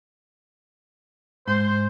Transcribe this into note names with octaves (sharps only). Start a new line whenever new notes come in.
G#2 C5 C6